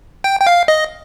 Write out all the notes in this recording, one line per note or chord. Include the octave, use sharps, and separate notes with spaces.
G5
G5
F5
D#5